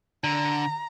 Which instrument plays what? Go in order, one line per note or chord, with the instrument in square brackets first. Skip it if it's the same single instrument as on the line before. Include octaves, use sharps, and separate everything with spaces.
[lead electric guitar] D3 [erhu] A#5